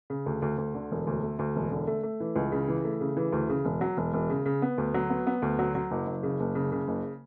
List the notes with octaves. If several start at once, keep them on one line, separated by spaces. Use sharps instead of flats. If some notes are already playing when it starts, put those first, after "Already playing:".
C#3
D2
D2
D2
D3
E1
D2
A3
D2
E1
D3
A3
A3
E3
C#2
C#3
E3
A3
C#3
E3
D2
C#3
E1
F#3
E1
E1
C#3
C#3
B3
D2
F#3
B3
B3
D2
F#3
F#3
F#1
F#1
C#3
F#1
C#3
C#3
F#1